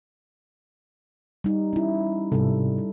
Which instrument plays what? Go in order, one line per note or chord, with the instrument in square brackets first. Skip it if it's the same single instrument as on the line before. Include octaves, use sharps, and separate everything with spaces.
[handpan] G3 D#4
C#4 E4
[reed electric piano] G#2 C3 [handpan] G3 A4